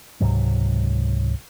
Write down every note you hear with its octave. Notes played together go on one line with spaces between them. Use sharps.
C#2 G#2 C3 F#3